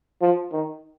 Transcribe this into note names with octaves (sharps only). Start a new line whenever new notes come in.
F3
D#3